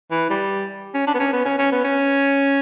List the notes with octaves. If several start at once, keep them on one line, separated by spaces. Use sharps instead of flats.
E3
G3
C#4
D4
B3
C#4
B3
C#4
C#4
B3
C#4